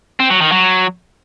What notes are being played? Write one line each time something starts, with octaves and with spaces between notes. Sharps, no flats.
C4
F#3
D#3
F#3